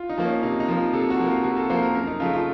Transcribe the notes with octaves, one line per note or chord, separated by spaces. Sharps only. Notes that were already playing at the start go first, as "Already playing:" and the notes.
Already playing: F4
D#4
F3 A#3
C#4
C3 D#4
D#4
F3 A#3
F4
C3 A4
F#4
F3 A#3
F4
C3 F#4
A4
F3 A#3 C5
A#4
F#2 A#4
D#4
C#3 F3 A3 F4
F4